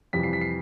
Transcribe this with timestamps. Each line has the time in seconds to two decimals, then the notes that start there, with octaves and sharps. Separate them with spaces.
0.13 F2 C3 E3 G3 B6
0.23 C7
0.33 B6
0.41 C7